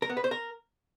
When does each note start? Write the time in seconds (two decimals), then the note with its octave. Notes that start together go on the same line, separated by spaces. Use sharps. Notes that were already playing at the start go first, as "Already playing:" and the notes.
0.02 A#4
0.10 B3
0.17 B4
0.24 C5
0.31 A#4